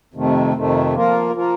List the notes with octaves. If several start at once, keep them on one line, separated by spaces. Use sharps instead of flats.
F2 C3 D#3 A3
F2 C3 D#3 A3
F3 A#3 F4 A#4
F3 A#3 F4 A#4